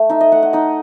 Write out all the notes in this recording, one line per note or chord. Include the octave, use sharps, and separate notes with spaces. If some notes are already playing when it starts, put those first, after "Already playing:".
Already playing: A3
D#4 E5
D#5
A3 F#5
F#5
D#4 D#5